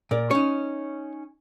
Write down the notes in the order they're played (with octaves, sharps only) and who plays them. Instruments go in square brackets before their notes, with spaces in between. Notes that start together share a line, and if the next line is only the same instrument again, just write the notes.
[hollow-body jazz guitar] A#2 [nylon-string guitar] A#4 D5
[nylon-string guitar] C#4 D#4 [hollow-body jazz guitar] C#5